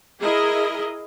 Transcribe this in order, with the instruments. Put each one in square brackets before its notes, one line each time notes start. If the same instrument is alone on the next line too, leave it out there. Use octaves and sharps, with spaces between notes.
[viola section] E4 G#4 A#4 D#5